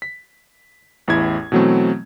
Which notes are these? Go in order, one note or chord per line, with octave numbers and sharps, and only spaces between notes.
B6
A1 E2 E4 G#6
B2 E3 F#3 A3 C4